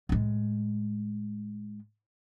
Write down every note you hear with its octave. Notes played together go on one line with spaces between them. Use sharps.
A2 G#3